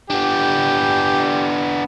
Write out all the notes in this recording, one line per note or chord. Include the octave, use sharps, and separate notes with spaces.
B3 D4 G4